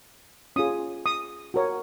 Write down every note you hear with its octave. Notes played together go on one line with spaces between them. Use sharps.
C#4 F4 G#4 D#6
D#6
F#4 A#4 C#5